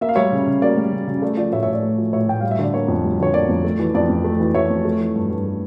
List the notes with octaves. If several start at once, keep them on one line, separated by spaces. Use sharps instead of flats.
A#3 E5
F5
G3 C#5 E5
C#3
C#3
A#3 D5
G3
C#3
C#3
A3 D5
F3 D5
A2 C#5 E5
C#5 E5
A2
D5
A3
F3
A2 C#5 E5
A2 G5
G3 F5
E5
D3 D5
A#3 C#5
F2
G3
D3 C#5
A#3 D5
F2
A3
E3
F2 D5
F2
A3
E3
F2 C#5 E5
F2
A3
E3
G2
G2
A3